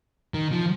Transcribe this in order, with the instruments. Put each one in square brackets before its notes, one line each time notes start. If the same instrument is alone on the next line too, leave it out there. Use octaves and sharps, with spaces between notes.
[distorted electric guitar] D#3
F3